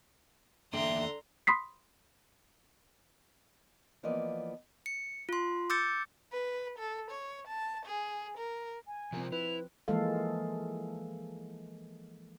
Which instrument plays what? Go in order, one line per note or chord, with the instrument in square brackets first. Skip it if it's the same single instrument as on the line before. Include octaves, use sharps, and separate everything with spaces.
[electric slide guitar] E2 A#3 G5 [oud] D3 [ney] E5 [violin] A#5 C6
[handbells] B5 C6 D#6 B6 C7
[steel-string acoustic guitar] E3 F3 A#3 B3 D5 D#5
[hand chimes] C#7
F4 C6
D6 E6 G6 A6 C#7
[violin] B4
A4
C#5
A5
G#4
A#4
[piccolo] G#5
[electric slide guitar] C3 A#4 [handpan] F3 C4
[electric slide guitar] E4 [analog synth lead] B4 [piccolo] F7
[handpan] E3 F3 G#3 A#3 A4 F5